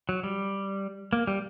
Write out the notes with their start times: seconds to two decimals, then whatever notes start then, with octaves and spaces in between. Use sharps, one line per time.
0.09 F#3
0.24 G3
1.13 A#3
1.27 G3